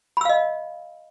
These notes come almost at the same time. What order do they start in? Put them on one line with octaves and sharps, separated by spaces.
B5 E6 F5 D#5